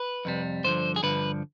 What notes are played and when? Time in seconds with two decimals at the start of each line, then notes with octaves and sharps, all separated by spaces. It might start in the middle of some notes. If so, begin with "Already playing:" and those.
Already playing: B4
0.25 F2 C3 G3
0.64 G2 D3 F3 C5
0.96 G#4
1.03 G2 D3 F3 B4